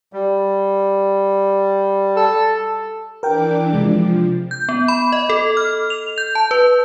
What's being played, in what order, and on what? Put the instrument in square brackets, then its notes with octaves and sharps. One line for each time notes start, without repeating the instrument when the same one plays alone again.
[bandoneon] G3
[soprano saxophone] A4
[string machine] E3 D4 D6 [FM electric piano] A#4 G5
[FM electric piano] C3 G#3 [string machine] F3
[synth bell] G6
B3
B5
D#5
A4
F6
F7
G6
A5
B4